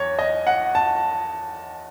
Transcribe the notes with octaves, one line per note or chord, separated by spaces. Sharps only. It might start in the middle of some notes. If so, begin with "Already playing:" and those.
Already playing: E2 C#5
D#5
F#5
A5